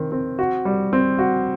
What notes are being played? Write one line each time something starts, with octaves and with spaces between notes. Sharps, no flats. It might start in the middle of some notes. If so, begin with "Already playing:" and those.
Already playing: D#3 C4
C4
F#4
G3
C4
F#4